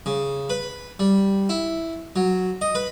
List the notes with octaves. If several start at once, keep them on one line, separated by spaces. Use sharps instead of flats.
C#3
B4
G3
E4
F#3
D#5
B4